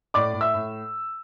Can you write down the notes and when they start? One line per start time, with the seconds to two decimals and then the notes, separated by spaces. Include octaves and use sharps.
0.14 A2 D5 D6
0.34 A2
0.41 E5 E6
0.54 A2